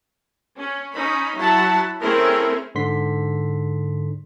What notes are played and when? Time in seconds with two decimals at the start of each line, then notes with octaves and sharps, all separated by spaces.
0.58 C#4
0.94 C#4 D#4 B5
1.38 F#3 E4 F#5 A5 B5
2.00 A3 C4 C#4 E4 G#4 A#4
2.75 G#2 D3 C6 B6